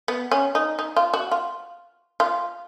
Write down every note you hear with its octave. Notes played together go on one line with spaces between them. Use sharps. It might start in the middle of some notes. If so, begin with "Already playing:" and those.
B3
C#4
D#4
D#4
F4
F#4
F4
F4